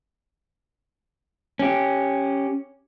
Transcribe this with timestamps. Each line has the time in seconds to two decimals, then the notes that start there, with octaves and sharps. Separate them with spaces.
1.59 C#4 G4